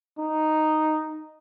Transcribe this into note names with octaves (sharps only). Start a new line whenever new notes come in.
D#4